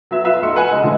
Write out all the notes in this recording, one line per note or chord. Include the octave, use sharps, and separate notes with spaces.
F#3 B3 E5
F4 B4 E5 F5
B1 D#4 F#5 C6 E6 C#7
B4 F#5 G#5 B5
C#3 G#3 D#5
A2 D3 F3 G#3